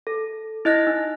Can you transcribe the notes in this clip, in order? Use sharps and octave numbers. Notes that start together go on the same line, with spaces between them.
A4
E4 D#5 F#6 A#6
D#4